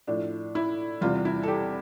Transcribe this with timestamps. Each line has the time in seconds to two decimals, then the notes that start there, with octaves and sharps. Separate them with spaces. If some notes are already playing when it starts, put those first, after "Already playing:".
0.07 A2 F3 D4
0.55 E4
1.01 E2 C3 G3 F4
1.25 E4
1.43 A4
1.48 G4